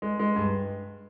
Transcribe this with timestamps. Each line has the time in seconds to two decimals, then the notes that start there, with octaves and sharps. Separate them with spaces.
0.02 G#3
0.19 G#3
0.36 G2